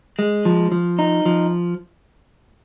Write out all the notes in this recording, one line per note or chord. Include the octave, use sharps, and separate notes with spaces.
G#3
F3
F3
D#4
F3